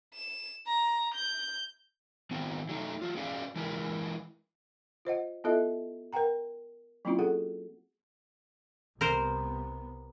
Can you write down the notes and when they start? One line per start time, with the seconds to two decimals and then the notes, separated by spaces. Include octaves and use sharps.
0.14 E7
0.67 A#5
1.15 G6
2.31 D#3 B3 C4 D#4
2.69 F#3 A3 D#4
3.02 F#3 F4
3.17 C#4 F#4 G#4 B4 D5 F5
3.56 E3 G#3 E4 A#4 B4
5.05 F4 C5 D#5 F#5
5.44 B3 E4 F4 A4 D#5 E5
6.13 A#4 B4 F#5 G5 A#5
7.05 F#3 A#3 C4 C#4 E4 F4
7.19 F#4 G#4 A4 F#5
9.01 C2 C3 B3 A#4 C5